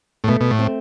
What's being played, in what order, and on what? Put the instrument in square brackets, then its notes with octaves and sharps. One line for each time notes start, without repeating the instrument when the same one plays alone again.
[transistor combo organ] A2
[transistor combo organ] B2 [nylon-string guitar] A3
[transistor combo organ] B2
A2
[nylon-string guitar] C4